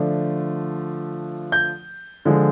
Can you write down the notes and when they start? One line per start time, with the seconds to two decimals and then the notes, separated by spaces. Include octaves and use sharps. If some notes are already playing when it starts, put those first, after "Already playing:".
Already playing: D3 F3 A3 D4
1.52 G6
2.25 D3 F3 G#3